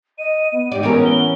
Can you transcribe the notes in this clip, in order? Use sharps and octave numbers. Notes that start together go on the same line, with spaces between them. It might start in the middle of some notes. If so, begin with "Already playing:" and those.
D#5 D#7
B3
G#2 G4 D5
E3 B3 C#4 A#4 D7
G7